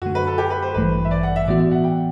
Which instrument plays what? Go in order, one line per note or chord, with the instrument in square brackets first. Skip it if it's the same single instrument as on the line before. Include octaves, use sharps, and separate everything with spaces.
[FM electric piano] F#2 D3 A3 [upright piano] F#4
[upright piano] B4
A4
G4
B4
C5
[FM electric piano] A1 G2 E3 A3 [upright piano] B4
[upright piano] E5
D5
F#5
E5
[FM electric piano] A2 E3 B3 F#4 [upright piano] D5
[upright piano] E5
F#5
G5